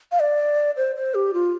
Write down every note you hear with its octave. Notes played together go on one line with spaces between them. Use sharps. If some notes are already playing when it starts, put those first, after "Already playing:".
F5
D5
C5
C5
G4
F4